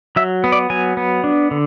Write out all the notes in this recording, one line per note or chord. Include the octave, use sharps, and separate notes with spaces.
F#3 E5
B3
D5
F#3 G#5
B3
D4
D3